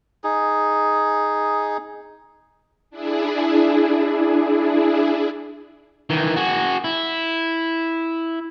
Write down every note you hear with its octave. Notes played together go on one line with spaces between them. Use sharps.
D#4 G#4
D4 E4 G#4
D#3 E3
F#4 G#4
E4